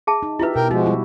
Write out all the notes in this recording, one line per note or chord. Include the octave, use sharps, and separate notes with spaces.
G#4 E5 A5
D#4
E4 F4 G4 B4 E5
B2 A#4 G5
F3 G#3 D#4 F#4
G3 E4